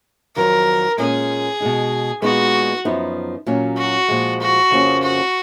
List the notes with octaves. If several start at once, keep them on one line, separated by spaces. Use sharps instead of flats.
F2 D#3 F#3 A#4
A#2 G#3 C#4 G#4
B2 G#3 D#4
A#2 G#3 B3 D#4 F#4
F#2 F3 B3 D#4
A#2 F#3 C#4
F#4
A#2 F3 G#3
F#4
F2 C#3 F3 A#3 C#4
F#4